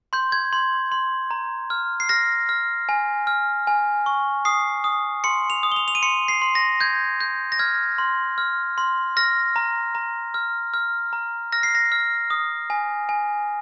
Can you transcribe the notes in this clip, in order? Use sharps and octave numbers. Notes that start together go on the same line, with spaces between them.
C6 G6
G#6
C6
C6
A#5
F6
C7
F6 A#6
F6
G#5
F6
G#5
C#6
D#6 C7
D#6
C6 C#7
F7
D#6
G7
F7
F7
D#7
C6 C#7
C7
C6
A#6
G6 G#6
G6
A#6
F6 G#6
C6
F6
C6
F6 A#6
A#5
A#5
F6
F6
A#5
F6 A#6
C7
A#6
F6
D#6
G#5
G#5